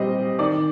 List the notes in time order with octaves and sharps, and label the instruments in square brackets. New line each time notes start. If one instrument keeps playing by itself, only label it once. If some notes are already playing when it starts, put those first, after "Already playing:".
Already playing: [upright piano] A#2 G3 C4 D#5
D#3 D5